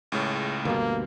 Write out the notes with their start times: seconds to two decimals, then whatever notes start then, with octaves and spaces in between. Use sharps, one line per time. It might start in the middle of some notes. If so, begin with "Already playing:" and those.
0.12 C#2 A2 C#3
0.65 D2 G2 B2 A#3